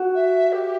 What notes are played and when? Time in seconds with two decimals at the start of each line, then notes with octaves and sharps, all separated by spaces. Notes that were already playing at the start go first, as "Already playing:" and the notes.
Already playing: F#4
0.15 E5
0.53 G4